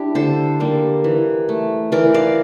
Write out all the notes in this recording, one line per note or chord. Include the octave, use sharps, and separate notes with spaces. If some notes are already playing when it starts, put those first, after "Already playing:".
Already playing: D4 E4 G4
D3 A4 C5
G3 A#3
E3
A3
E3 A#4 D5
D5 F5